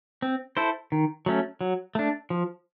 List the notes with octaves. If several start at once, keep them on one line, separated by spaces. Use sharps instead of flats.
C4
E4 A4 C5
D#3
F#3 A3 C#4
F#3
A3 D4
F3